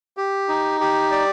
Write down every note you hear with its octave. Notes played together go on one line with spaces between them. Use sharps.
G4
D#4
G4
D5